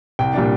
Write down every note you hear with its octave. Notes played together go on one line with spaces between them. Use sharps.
C2 G5
A#2 G3 D4